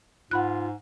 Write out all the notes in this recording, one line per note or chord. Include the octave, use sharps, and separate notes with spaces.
G#2 F4 F#5 B5 F#6